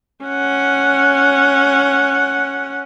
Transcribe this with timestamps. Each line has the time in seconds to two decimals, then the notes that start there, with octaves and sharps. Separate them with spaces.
0.25 C#4 F#5